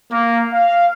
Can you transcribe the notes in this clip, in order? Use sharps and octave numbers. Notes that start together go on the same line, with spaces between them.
A#3
F5